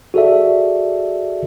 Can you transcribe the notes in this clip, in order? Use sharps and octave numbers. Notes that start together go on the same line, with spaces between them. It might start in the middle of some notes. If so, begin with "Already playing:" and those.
F#4 G#4 A4 D5 E5